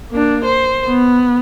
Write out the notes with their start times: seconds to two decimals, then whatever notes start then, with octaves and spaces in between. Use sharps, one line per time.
0.11 A#3 D4
0.45 C5
0.88 B3